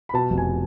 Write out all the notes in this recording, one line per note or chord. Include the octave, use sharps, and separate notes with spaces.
B5
B2 A5
F1
G#5